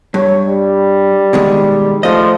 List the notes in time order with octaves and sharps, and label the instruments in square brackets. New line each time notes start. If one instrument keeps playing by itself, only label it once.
[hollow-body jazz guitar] G2 [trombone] C#5
[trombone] G3
[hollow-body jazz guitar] B2 D#3 G#3
[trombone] F3 [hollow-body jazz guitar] A3 D#5